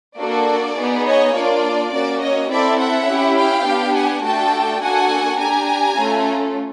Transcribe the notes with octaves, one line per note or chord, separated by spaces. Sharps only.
A#3 D4 F#4 A4 D5
B3 D#4 G#4
C#5 D#5
A#3 D4 F4 D5
A#3 C#4 F#4 D5
C#5 D#5
C4 E4 A4 D5 E5
E5 F#5
C#4 E4 G4
F5 G5
B3 D4 G4
F#5 G#5
A3 D4 F#4 A4 G5 A5
A#3 D4 F#4 A4 F#5 G#5
D4 G4 G#5 A#5
A3 C#4 F4 A4